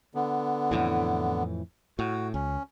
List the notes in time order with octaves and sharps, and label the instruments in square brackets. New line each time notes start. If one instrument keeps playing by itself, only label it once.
[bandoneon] D3 B3
[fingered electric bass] F2 A2 E3
[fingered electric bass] A2 [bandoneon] F#4
[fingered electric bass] C#2 [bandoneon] C#4